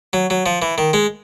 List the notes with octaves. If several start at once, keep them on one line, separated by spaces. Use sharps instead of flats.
F#3
F#3
F3
E3
D#3
G#3